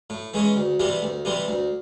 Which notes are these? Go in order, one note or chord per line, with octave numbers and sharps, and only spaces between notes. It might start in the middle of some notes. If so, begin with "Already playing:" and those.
A2
E3 G#3 C#4
D2
C3 E3 G3 C4
D2
C3 E3 G3 C4
D2